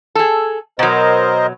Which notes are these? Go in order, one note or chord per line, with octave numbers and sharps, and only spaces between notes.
G#4 A4
B2 F#3 A#4 C5 D#5